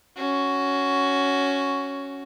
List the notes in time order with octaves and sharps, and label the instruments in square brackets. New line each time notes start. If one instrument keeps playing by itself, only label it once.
[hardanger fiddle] C#4 F#4